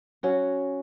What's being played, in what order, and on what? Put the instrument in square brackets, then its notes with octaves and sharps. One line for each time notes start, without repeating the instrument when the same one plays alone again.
[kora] F#3 C#4 F#4